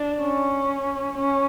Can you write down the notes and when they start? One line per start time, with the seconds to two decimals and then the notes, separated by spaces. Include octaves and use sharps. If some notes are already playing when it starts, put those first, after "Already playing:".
Already playing: D4
0.21 C#4
1.18 C#4